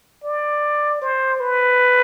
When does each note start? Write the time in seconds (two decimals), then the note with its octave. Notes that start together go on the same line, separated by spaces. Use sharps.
0.24 D5
1.02 C5
1.40 B4